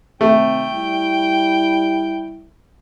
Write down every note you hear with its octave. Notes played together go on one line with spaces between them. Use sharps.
C3 D#3 A3 C4 G5
G3 E4